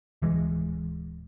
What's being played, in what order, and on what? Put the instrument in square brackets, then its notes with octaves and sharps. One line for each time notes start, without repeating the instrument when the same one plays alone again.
[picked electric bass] D1 E3 G#3